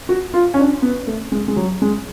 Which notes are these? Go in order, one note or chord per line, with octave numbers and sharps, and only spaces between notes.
F#4
F4
C#4
D4
B3
A3
G#3
G#3
F#3
G#3